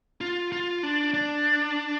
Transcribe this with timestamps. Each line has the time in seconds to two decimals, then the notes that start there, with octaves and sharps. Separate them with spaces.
0.21 F4
0.52 F4
0.83 D4
1.14 D4